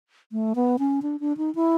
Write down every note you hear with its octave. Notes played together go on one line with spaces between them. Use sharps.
A3
B3
C#4
D4
D4
D#4
E4